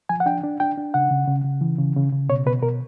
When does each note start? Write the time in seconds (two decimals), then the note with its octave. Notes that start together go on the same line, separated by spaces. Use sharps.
0.09 F3 G#5
0.20 F#5
0.26 D4 G5
0.44 D4
0.60 D4 G5
0.78 D4
0.94 C#3 F#5
1.11 C#3
1.27 C#3
1.44 C#3
1.61 E3
1.79 C#3
1.96 C#3
2.12 C#3
2.29 B2 C#5
2.47 B2 B4
2.62 B2 A#4